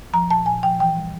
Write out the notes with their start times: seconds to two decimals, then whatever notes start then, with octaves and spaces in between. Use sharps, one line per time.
0.13 F3 A#5
0.30 A#2 A5
0.46 A#2 G#5
0.63 F3 G5
0.79 E3 G5
0.97 G3